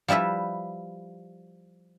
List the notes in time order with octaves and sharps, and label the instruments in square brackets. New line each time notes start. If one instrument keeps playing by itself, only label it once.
[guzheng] F3 G3 E4 B4 E5